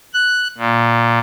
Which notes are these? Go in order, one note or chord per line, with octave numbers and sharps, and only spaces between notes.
F#6
A#2